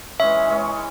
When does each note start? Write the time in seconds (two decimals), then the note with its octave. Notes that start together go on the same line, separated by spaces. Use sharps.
0.19 E3 G#3 C#4 E5
0.48 E3 G#3 C#4